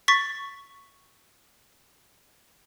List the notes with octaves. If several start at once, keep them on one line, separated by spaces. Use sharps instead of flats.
C#6 A6 B6